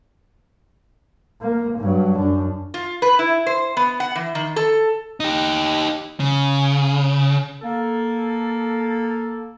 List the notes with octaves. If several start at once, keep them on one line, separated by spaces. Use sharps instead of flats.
A#3
G2 F#3
F#2 D4
F4
B4
E4
C5
B3
F#5
E3
D#3
A4
D#4 G4
C#3
A#3 A4